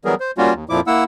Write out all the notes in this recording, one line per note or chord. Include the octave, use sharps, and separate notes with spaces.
E3 F#3 G3 B3 G#4 A#4
C5
G3 A#3 C#4 F4 F#4
D#2
F2 A#2 F3 E4 D6
A#3 E4 F#5 E6